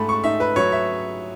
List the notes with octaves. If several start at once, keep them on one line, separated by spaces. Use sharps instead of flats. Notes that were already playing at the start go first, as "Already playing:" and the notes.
Already playing: G#2 A3 A5 B5
C#6
D#4 E5
B4
F#3 C#5
E5